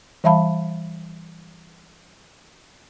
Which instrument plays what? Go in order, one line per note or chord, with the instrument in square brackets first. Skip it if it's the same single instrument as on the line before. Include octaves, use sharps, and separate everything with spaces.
[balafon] E3 G3 E5 F5 A5 B5